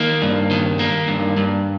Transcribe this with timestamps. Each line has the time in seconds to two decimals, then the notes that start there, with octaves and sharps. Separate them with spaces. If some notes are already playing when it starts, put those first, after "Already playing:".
Already playing: D#3 A#3
0.22 G2
0.51 D#3
0.79 A#3
1.08 G2
1.37 G2